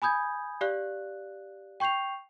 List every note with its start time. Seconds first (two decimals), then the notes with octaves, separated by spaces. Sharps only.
0.02 G#5 B5 D#6 G6 G#6
0.61 G4 D5 F5 F#6
1.80 G5 C#6 G6 C7 F7